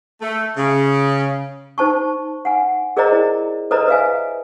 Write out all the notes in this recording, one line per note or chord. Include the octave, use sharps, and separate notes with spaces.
A3
C#3
D#4 C5 A5 C#6
F#5 G#5
G#4 A#4 C5 D5 D#5 A#5
E4
A4 B4 C5 D5 D#5 A#5
B4 E5 F5 G#5